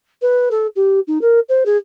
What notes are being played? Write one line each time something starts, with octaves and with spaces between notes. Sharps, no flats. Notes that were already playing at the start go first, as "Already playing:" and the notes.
B4
A4
G4
D#4
A#4
C5
G#4